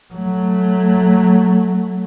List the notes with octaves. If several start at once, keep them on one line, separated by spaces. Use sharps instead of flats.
F#3 A3